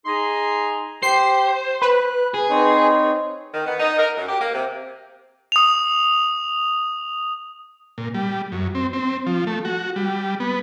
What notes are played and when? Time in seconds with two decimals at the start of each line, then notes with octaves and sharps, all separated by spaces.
0.06 D#4 G#4 A#5 C6
1.03 G4 C5 C7
1.82 B4 F#6
2.34 G#4
2.49 C4 D#4 C#5
3.53 D#3
3.65 B3
3.79 D#4
3.97 A#4
4.16 F#2
4.27 G4
4.39 A#3
4.52 C3
5.52 D#6 F7
7.98 A#2
8.14 G3
8.52 F#2
8.75 C4
8.93 C4
9.26 F3
9.47 A3
9.65 F#4
9.96 G3
10.40 B3